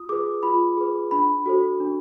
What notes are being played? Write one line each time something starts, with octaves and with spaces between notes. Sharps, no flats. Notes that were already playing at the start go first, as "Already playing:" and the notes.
Already playing: F4 D#6
G#4 B4 D6
F4 B5
G#4 B4
D4 B5
F#4 A4 C5
D4